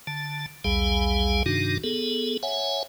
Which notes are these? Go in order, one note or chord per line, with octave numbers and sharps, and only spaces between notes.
D3 A5
B1 E2 G3 G#4 F5 G#5
G2 C3 D#3 D4 D#4 F#4
B3 G#4 A4
C#5 E5 F#5 G#5